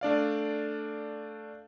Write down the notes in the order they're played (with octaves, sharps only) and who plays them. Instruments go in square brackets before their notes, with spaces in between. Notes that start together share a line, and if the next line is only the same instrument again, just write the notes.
[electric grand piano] A3 D4 D5 F5